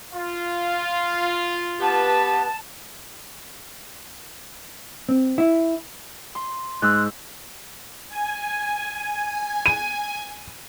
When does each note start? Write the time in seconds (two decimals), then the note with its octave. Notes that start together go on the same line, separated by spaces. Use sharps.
0.12 F4
1.80 B3 G4 B4 A5
5.09 C4
5.38 E4
6.35 C6
6.82 G#2 E6 F#6
8.09 G#5
9.66 D#7